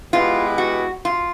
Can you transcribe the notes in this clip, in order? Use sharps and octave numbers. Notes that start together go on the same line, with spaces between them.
G#3 B3 E4 F4 G4 B4
F#4
F4